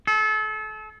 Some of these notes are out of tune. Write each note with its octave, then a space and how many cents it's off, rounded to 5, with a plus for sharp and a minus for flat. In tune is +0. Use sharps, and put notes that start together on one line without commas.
A4 -35